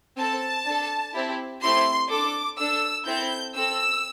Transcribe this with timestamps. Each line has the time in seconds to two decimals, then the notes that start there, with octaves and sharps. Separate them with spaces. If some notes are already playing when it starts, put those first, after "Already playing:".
0.17 C4 A4 A5
0.66 D4
0.71 A4
1.14 C4 E4 G4
1.62 A3 C4 E4 G4 C6
2.10 D4 A4 D6
2.58 D4 A4 E6
3.06 C4 E4 A4 G6
3.55 C4 A4 E6